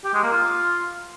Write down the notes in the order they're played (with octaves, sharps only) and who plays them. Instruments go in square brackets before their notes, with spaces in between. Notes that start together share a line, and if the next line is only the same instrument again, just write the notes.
[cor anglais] G4
G#3
A#3
F4